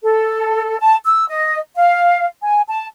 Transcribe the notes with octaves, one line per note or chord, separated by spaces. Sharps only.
A4
A5
E6
D#5
F5
G#5
A5